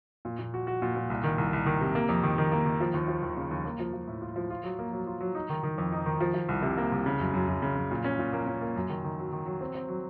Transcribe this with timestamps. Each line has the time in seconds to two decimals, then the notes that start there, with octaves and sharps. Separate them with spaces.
0.25 A#2
0.39 A#2
0.54 F#4
0.67 F#4
0.82 A#2
0.96 A#2
1.10 C2
1.24 D#3
1.38 C2
1.53 C2
1.66 D#3
1.81 C3
1.95 A#3
2.09 F2
2.23 D#3
2.38 D#3
2.51 A#3
2.66 D#3
2.80 F3
2.94 D#2
3.08 F3
3.22 D#2
3.37 C#3
3.51 D#2
3.66 A#3
3.79 F3
3.93 F3
4.07 A2
4.22 F4
4.36 F3
4.50 F4
4.64 F#3
4.79 A#3
4.93 F#3
5.07 F4
5.20 F#3
5.35 D#4
5.49 D#3
5.63 D#3
5.78 F2
5.92 D#4
6.06 D#3
6.20 F3
6.34 F3
6.49 C2
6.62 C3
6.77 A#3
6.92 C2
7.06 C#3
7.20 F#2
7.34 F#2
7.47 F#2
7.62 C#3
7.76 F#2
7.91 A#2
8.04 C#4
8.19 A#2
8.33 A#3
8.47 C#4
8.61 A#3
8.76 F#2
8.90 D#3
9.04 D#3
9.19 F#3
9.32 D#3
9.46 F#3
9.61 C4
9.75 C4
9.88 F#3